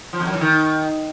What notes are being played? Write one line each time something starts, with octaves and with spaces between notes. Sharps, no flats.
F3
F2
F#2
E3
D#3